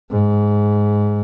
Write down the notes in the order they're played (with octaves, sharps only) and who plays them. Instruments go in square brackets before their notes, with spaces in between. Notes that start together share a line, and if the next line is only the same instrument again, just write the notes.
[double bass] G#2